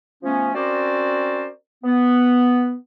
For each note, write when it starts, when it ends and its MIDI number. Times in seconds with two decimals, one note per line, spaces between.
0.23 0.51 53
0.23 0.51 57
0.23 0.51 59
0.23 0.51 61
0.54 1.48 60
0.54 1.48 61
0.54 1.48 66
0.54 1.48 70
0.54 1.48 72
0.54 1.48 74
1.84 2.74 59